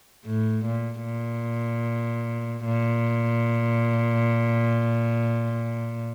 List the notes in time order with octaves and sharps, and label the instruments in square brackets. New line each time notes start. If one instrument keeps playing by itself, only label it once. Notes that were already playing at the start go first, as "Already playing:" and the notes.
[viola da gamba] A2
A#2
A#2
A#2